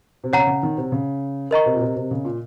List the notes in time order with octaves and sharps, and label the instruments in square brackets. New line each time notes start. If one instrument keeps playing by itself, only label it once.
[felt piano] C3
[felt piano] C#3 [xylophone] C#5 F#5 A#5
[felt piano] C#3
D#3
C3
C#3
[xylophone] A#4 D#5 A#5 C#6
[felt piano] C3
A#2
C3
C3
C#3
A#2